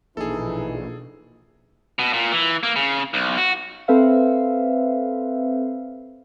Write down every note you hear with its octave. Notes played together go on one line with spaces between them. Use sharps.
A#1 B2 E3 D#4 G#4 A4
B2
A#2
E3
A#3
C#3
B1
F#4
C4 A4 B4 C5 E5 F5